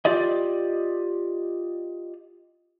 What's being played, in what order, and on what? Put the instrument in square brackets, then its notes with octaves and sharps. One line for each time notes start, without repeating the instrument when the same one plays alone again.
[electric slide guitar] F4 G4 D5 D#5